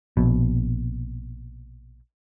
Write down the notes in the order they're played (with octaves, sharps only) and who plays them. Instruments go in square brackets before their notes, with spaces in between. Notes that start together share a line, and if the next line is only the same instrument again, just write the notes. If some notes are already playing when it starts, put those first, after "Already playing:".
[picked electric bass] A#1 B2